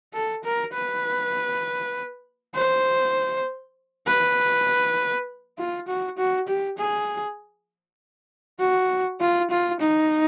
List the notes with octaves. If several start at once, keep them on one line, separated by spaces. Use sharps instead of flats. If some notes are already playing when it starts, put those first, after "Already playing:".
A4
A#4
B4
C5
B4
F4
F#4
F#4
G4
G#4
F#4
F4
F4
D#4